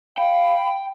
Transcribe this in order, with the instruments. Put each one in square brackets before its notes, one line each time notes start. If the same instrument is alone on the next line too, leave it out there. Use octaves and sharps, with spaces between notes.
[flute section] F5 [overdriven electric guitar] G5 [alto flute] B5